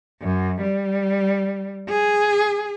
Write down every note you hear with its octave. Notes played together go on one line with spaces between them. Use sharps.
F#2
G3
G#4